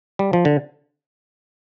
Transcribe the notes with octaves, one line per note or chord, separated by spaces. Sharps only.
G3
F3
D3